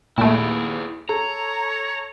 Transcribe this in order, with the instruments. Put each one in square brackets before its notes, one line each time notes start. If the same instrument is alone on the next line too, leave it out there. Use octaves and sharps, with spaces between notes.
[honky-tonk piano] D#2 D7 [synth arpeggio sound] A#2 A3 [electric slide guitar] E4 G#4
[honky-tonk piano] A4 [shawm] C#5 [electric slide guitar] A#5